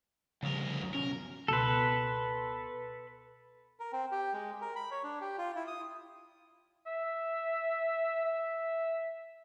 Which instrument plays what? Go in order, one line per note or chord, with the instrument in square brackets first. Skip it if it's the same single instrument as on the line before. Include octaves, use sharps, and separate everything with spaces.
[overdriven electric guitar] D2 A#4 [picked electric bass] C#3 F3 G3
[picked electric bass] C#2 F#2 F#3
[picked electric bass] F#1 B2 C#4 [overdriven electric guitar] A#4
[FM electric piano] C#2 B2 C6 [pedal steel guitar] A4 B4
[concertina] A#4
C4
G4
G#3
A#4
B5
C#5
D4
G4
F4
E4
D#6
[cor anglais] E5
E5